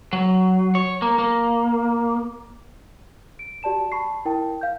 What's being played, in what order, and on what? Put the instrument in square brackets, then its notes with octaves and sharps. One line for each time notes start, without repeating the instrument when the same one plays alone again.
[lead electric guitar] F#3
C#5
A#3
A#3
[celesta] D7
F#4 G4 D5 A5 E7
A5 B5 C#6 C7
E4 A#4 G5 A5
F5 G6